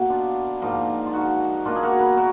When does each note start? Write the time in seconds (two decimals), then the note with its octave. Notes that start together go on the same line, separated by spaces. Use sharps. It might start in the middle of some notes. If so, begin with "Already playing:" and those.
Already playing: B2 A#3 B3
0.09 D4 F4
0.62 G#2 F3 A#3
1.06 F4
1.13 D#4 F#4
1.65 B2 A#3 D4 F4
1.76 G#4
1.83 F#4 A#4
2.00 G#4 B4
2.17 F#4 A#4